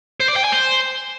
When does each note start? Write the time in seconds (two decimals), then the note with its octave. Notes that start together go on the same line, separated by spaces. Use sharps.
0.20 C5
0.28 D5
0.36 G5
0.44 G#5
0.52 C5